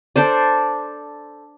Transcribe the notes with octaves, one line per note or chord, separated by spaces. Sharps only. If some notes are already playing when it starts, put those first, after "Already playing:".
D4 A4 C5 D5